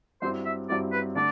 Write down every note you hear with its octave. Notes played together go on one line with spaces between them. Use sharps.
G2 F#3 C4 E4 C5
E5
G2 F#3 C4 E4 D5
B4
D3 A3 D4 D5